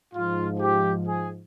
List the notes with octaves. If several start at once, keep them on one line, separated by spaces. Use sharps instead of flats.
G#2 F3 F4
G4
G#4